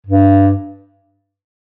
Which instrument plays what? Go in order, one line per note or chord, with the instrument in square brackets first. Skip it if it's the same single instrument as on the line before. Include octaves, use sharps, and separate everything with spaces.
[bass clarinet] G2